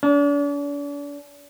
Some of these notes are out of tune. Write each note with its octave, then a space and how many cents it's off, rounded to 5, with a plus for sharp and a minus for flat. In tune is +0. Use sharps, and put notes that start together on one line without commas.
D4 -40